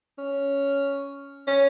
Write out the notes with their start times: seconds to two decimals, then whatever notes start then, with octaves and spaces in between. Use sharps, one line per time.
0.18 C#4
1.48 C#4